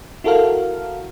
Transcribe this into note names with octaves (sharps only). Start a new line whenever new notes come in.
E4 F#4 A4 A#4 F5